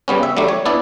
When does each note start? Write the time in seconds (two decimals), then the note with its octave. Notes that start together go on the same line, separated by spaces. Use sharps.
0.08 C#3 G3 B3 C#4
0.23 E5
0.37 F#3 G3 A3 D4
0.48 C#5
0.65 B3 D4 E4 D5